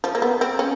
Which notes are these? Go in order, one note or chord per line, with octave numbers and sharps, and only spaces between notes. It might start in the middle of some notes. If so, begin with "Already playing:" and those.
F3
A#3
B3
C4
C#4